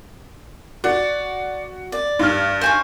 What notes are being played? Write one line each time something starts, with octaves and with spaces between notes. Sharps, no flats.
F#4 D5
D5
G2 F6
C5 G#5 C#6